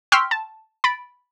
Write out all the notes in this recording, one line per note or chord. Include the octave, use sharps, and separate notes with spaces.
G5 C6 C#6 E6 F6 B6
A5
B5 A6 D7